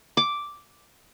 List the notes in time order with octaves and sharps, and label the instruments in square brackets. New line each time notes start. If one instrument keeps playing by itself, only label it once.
[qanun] D6